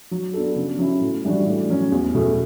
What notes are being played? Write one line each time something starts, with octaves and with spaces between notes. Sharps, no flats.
F#3
B3 D4 A4
C#3
F#3 C#4 E4
A2
E3 G3 D4 F#4
A2
F#3 C#4
E2
B2 A3